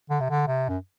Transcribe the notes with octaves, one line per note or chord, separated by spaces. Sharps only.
D3
C3
D3
C3
F#2